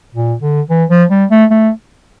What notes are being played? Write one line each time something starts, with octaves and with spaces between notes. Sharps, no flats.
A#2
D3
E3
F3
G3
A3
A3